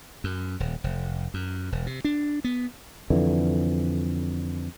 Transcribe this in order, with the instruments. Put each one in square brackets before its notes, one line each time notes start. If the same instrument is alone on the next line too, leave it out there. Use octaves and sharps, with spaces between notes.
[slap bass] F#2
D#1
F1
F#2
E1
C3
D4
B3
[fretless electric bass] F2 D3 E3